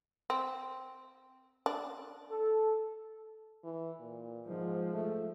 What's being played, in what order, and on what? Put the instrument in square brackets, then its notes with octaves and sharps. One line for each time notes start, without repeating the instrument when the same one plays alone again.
[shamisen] C4
D4
[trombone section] A4
[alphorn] E3
A#2
[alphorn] G#2 [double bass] F3 G#3
[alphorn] A3